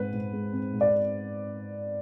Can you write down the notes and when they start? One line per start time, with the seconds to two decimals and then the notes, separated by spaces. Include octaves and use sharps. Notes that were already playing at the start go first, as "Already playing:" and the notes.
Already playing: G#2 C4 B4
0.13 G#2
0.33 G#3
0.53 C4
0.73 G#2
0.81 D5